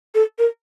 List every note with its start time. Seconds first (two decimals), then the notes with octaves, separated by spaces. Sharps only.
0.15 A4
0.39 A#4